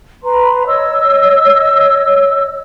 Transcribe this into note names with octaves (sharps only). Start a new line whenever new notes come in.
B4 A#5 C6
C#5 D#5 E6